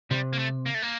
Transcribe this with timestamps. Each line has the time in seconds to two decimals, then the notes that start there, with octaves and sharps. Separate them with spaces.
0.11 C3 G3
0.33 A#3
0.39 A3
0.66 A#3
0.74 A3
0.82 A#3